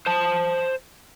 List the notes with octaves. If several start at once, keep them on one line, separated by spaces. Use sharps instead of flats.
C5 A5